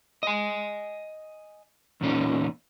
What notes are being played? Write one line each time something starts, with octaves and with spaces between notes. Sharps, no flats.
D#5 G#5
E2 A#2 C#4 D#4